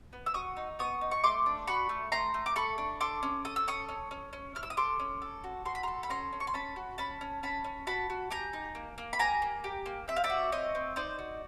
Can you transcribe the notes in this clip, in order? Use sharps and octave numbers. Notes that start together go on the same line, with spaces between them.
B3
E6
F#4 C#6 D#6
D#4
B3 C#6 D#6
D#4
C#6
A3 C6 D6
D4
F#4 B5 C#6
A3
A3 A#5 C6
A3
D6
A4 B5 C#6
D4
A4 C6 D6
C#4
A4 D#6
E6
C#4 C#6 D#6
C#4
C#4
C#4
E4 F6
E6
D#6
A4 C6 D6
C#4
A4
F#4
F#4 C6
B5
A4 A#5 C6
B5
C#4 A#5 C6
C#4
C#6
C6
C#4 A5 B5
F#4
C#4 A5 B5
C#4
C#4 A5 B5
C#4
F#4 A5 B5
F#4
G4 G#5 A#5
D#4
A#3
A#3
B5
G4 G#5 A#5
A#3
G4
A#3
C4 E5
F5
D5 E5
F#4
C4 C#5 D#5
C4
D#4 C5 D5
F#4